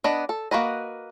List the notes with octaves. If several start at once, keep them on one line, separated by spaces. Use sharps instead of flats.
B3 D4 D#5
A4
A#3 F#4 B4 D#5